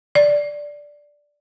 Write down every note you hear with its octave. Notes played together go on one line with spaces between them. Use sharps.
D5